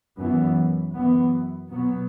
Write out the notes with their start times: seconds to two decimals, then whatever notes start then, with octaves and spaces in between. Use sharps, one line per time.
0.19 F#2 E3 B3
0.94 F#2 E3 B3
1.69 B2 F#3 B3